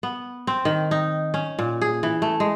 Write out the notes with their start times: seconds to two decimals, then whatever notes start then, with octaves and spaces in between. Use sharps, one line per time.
0.03 B3
0.47 C4
0.65 D#3
0.91 D#4
1.34 C#4
1.59 A#2
1.81 G#4
2.03 E3
2.22 A3
2.40 G#3